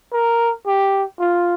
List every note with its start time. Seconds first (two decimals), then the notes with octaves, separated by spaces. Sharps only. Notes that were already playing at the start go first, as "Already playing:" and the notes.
0.13 A#4
0.67 G4
1.20 F4